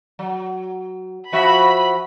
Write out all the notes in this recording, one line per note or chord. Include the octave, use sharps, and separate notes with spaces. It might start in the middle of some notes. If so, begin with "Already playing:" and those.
F#3
F3 F#4 E5 B5